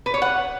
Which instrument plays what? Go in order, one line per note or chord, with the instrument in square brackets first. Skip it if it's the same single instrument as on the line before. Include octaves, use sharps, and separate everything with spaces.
[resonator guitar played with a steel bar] B4
C#5
F#5